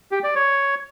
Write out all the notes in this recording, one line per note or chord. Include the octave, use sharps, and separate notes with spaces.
G4
D5
C#5